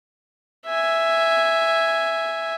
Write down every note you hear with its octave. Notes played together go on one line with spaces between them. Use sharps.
E5 G#5